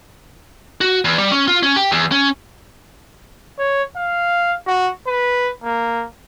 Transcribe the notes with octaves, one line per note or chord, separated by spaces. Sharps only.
F#4
E2
G3
C#4
F4
C#4
G4
E2
C#4
C#5
F5
F#4
B4
A#3